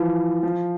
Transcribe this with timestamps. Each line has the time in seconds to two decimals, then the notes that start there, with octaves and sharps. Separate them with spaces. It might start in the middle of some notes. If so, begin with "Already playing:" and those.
Already playing: E3 F3
0.43 F3